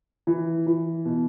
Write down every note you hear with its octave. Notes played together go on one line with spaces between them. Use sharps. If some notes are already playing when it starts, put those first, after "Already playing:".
E3
E3
B2